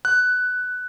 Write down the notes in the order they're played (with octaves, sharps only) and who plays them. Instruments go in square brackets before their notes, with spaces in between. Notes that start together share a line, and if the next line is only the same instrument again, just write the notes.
[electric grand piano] F#6